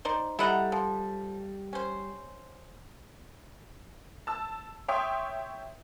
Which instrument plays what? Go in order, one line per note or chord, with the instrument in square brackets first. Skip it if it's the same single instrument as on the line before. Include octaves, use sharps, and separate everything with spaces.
[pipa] D#4 C5 D5
[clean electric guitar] G3 [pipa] E4 D#5 A#5 [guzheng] A4 F#5
[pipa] F3
C#4 C5
[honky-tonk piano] A5 E6
C#5 E5 G5 C6 C#6 D#6